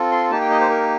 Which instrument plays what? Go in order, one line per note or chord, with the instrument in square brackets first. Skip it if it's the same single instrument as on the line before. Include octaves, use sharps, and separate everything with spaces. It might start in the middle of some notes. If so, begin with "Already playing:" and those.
Already playing: [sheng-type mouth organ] C4 F4 A4
C6
A#3 D#4 G4 A5
G5
D#5
C5
A#4